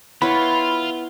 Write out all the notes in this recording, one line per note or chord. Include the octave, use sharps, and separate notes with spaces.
B3 E4 F4 C#5 B5